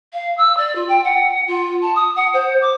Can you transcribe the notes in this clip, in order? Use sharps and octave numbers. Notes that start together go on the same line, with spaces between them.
F5
E6
D5
F4
G5
F#5
F4
A5
D#6
F#5
C5
D6